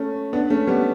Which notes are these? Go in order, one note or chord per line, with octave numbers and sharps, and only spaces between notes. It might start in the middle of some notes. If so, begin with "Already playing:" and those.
Already playing: A3 C#4
B3 D4
A3 C#4
G3 B3